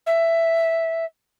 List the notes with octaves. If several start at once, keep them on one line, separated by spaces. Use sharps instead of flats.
E5